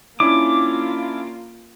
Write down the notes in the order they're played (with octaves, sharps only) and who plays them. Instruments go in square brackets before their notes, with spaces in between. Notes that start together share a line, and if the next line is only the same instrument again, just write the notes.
[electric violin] A#3 F4 [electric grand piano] C#4 D4 E4 [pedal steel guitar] D6